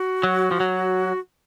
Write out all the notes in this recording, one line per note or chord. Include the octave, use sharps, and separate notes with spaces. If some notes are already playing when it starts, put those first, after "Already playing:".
Already playing: F#4
F#3
F3
F#3